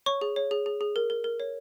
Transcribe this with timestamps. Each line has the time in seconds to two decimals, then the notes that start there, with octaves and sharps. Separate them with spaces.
0.06 C#5 C#6
0.21 G#4
0.36 C#5
0.51 G#4
0.66 G#4
0.81 G#4
0.96 A#4
1.10 A#4
1.24 A#4
1.40 C#5